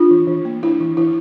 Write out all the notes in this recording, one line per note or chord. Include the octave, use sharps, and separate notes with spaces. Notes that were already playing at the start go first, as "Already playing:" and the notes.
Already playing: D4 F4
E3
E3
A#3
D4 E4
E3
E3 E4